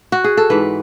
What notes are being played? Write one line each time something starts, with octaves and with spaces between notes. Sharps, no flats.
F#4
G#4
A4
G#2 E3 B4